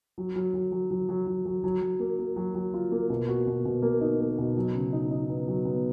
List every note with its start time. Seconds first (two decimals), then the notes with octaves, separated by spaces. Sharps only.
0.18 F#3
0.36 F#3
0.54 F#3
0.72 F#3
0.91 F#3
1.09 F#3
1.27 F#3
1.45 F#3
1.64 F#3
1.81 F#3
2.00 A#3
2.19 A#3
2.36 F#3
2.55 F#3
2.74 F4
2.92 A#3
3.10 B2
3.28 F#4
3.47 B2
3.65 B2
3.82 A#3
4.01 D#4
4.20 A#3
4.38 B2
4.57 F#3
4.74 C#3
4.93 D#4
5.11 D#4
5.29 B3
5.48 F#3
5.65 B3